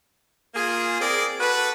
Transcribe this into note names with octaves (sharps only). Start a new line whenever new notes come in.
A#3 F4 G#4
C4 G#4 A#4 D5
F#4 A4 B4